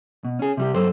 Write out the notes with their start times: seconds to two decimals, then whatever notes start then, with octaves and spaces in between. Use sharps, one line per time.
0.25 B2
0.39 C#4 G#4
0.57 C3 G3 G4
0.74 G2 F#3 A4 C5